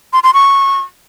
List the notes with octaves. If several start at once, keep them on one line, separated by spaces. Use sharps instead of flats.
C6
C6
C#6